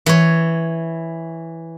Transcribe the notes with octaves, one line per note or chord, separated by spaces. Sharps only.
E3 C#5